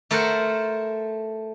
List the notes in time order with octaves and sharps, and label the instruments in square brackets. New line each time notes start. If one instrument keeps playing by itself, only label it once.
[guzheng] A3 A4 A#4 C5 F#5